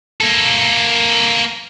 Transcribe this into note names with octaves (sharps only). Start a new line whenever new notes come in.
A#3 A4